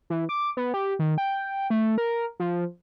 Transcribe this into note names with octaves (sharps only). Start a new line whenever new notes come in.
E3
D6
B3
G4
D#3
G5
A3
A#4
F3